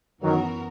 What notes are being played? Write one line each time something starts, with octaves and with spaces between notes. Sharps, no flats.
F#2 D#3 E3 F#3 B3 F#4 A#4